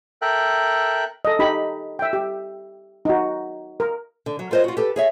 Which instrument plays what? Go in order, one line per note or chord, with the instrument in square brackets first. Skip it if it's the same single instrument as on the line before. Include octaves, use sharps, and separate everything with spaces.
[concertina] A4 A#4 E5 G5 F#6
[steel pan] A4 D#5
D#4 G4 B5
E5 G5
G4
D#4 F#4
A#4
[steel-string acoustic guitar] D3
F#3
F4 A#4 C5 C#5 D#5
F4 F#4
G4 A4 B4
G#4 C#5 E5